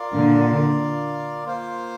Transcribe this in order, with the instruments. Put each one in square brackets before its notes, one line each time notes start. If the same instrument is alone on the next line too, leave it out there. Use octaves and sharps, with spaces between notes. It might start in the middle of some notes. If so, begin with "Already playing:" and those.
Already playing: [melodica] F4 A#4 D5 F5
[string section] A#2 D3
[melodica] A#3 F4 C5 F5